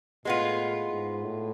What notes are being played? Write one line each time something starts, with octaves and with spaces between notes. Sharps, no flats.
A2 G#3 B3 F4
G#2
A2